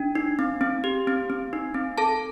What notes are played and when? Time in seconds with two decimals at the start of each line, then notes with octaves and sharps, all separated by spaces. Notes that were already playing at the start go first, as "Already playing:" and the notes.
Already playing: D4
0.15 D#4
0.39 C4
0.61 C4
0.84 G4
1.07 C4
1.30 C4
1.53 D#4
1.74 C4
1.98 A4 A5